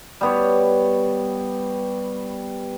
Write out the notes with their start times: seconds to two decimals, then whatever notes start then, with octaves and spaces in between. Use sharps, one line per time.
0.21 G3 B3 C#5